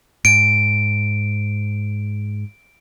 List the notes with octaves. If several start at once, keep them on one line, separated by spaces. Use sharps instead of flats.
G#2 D7